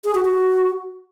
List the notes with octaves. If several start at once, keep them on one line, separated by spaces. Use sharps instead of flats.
G#4
F#4
F#4